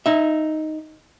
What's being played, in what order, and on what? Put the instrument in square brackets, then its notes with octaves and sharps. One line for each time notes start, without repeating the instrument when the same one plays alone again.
[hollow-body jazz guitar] D#4 E5